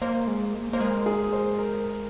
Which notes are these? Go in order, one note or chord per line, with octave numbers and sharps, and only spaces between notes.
A#3 C5
G#3
A#3
A#3 C5
G#3 A#4
G#4
C5
A#4